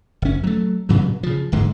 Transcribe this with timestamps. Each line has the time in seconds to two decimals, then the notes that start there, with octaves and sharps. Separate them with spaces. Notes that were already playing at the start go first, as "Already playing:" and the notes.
0.22 F#1 C#4
0.44 F#3 A3
0.89 G2 A#2 C#3 F#3
1.23 C#3 F3
1.52 D1 G#2 D3 G#3